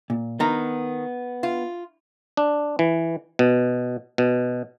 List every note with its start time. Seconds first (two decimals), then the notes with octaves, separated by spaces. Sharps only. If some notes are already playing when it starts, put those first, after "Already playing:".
0.10 A#2
0.40 D#3 B3 A#5
1.43 F4
2.37 D4
2.79 E3
3.39 B2
4.18 B2